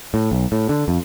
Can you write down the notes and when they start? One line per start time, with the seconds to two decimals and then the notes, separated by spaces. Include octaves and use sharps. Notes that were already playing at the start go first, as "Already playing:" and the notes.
0.14 A2
0.32 B1
0.52 A2
0.69 D3
0.88 F2